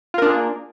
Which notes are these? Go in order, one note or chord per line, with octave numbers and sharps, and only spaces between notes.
A#3 D4 F4 G#4 A#4